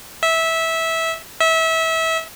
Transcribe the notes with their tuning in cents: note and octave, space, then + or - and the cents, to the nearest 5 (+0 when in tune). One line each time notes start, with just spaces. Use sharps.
E5 -15
E5 -25